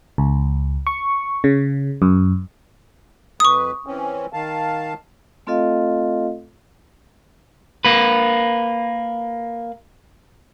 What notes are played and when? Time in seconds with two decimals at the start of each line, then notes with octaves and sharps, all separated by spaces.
0.18 C#2
0.87 C#6
1.44 C#3
2.02 F#2
3.40 F2 B4 C#6 D#6
3.87 E3 C4 C#4
4.33 D#3 F5 A5
5.47 A3 C4 F4 A4 D#5 F5
7.85 A#3 B4